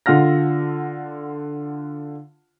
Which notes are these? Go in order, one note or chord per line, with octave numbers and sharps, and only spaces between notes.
D3 F4 F#5 F6 A#6